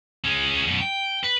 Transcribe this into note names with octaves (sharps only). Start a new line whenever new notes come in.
G#3 C#4
F#2 B2
G5
B4